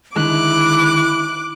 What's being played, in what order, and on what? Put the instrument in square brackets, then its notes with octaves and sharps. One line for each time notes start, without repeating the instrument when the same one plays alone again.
[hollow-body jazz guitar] D3 D#3 G#3 [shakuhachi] E4 [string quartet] D6 [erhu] F#6